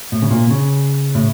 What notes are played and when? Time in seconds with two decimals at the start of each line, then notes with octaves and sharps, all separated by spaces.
0.12 A2
0.22 C#3
0.31 A#2
0.51 C#3
1.15 A2